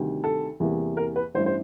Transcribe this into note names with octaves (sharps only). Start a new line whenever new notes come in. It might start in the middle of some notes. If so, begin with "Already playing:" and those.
Already playing: D2 C3 D#3 G3
A4
E2 C3 E3 G3 A#3
A#4
B4
A1 G2 E3 C5
C5